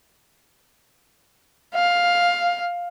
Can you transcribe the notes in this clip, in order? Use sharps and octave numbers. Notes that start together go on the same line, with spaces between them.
F5